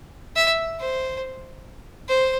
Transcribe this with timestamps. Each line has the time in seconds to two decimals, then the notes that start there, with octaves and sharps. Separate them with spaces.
0.36 E5
0.80 C5
2.09 C5